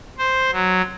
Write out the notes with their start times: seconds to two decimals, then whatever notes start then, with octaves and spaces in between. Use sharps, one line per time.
0.18 C5
0.52 F#3